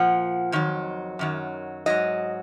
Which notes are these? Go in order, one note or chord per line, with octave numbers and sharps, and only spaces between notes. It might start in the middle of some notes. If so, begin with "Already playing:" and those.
Already playing: A#2 F3 F#5
F2 D#3 F#3
F#2 D#3 F#3
G#2 F#3 D#5